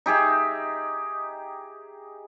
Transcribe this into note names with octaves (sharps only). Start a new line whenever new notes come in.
D#4 G4 G#4 E5